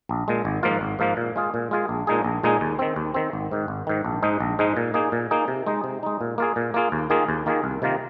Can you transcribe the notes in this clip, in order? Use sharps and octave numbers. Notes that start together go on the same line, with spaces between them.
A#1
A#2 G#3
G#1
G#2 F3 A#3 F4
G#1
G#2 F3 A#3 F4
A#2
G#3 F4 G#4
A#2
G#3 F4 G#4
A#1
A#2 G#3 D#4 G#4
A#1
A#2 G#3 D#4 G#4
D#2
D#3 C4
D#2
D#3 C4
G#1
G#2 D#3
G#1
G#2 D#3
A#1
G#2 G#3 D#4
A#1
G#2 G#3 D#4
A#2
A#3 D#4 G#4
A#2
A#3 D#4 G#4
C3
G#3 D#4
C3
G#3 D#4
A#2
A#3 F4 G#4
A#2
A#3 F4 G#4
D#2
D#3 A#3 F4 G#4
D#2
D#3 A#3 F4 G#4
C2
C3 D#3 A#3 F4